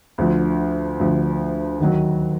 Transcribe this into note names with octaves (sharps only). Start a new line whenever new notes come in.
D2 D3 F3
D2 D3 F3
D#2 D#3 F#3